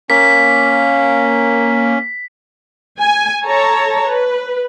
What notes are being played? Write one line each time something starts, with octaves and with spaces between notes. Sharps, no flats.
A#3 C#4 B6
G#5
A4 C#5 A5 A#5
B4